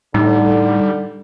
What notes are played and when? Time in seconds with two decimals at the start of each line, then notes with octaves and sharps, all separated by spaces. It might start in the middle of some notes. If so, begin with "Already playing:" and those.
0.14 A2 D3 G3 D#4